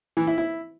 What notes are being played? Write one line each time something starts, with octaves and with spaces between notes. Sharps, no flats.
E3
E4
E4